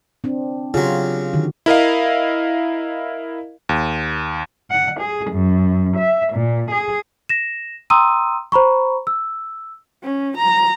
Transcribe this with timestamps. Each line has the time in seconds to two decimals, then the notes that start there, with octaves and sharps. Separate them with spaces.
0.24 C4 D4
0.74 C#3 F#3 F4 G4
1.33 D3 D#3 F#4
1.66 E4 A#4 D#5 F5
3.69 D#2
4.71 F#5
5.00 G#4
5.31 F#2
5.97 E5
6.33 A#2
6.71 G#4
7.29 A#6 E7
7.90 G5 A#5 C6 D#6 E6 D#7
8.52 C5 A#5 B5 C#6
9.07 E6
10.03 C#4
10.38 A#5